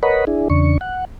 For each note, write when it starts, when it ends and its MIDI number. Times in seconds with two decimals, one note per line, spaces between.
0.03 0.25 70
0.03 0.25 71
0.03 0.25 73
0.03 0.25 75
0.03 0.25 78
0.03 0.25 83
0.27 0.48 62
0.27 0.48 64
0.27 0.48 68
0.50 0.78 40
0.50 0.78 49
0.50 0.78 62
0.50 0.78 85
0.81 1.05 78